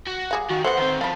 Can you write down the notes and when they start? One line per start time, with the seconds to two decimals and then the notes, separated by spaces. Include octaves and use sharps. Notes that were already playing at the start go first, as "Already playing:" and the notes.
0.07 F#4
0.31 G3 G#4 F5
0.50 D#3 F#4
0.64 A3 B3 F#4 C5 F#5
0.77 D#3 C4
1.01 F3 F5 B5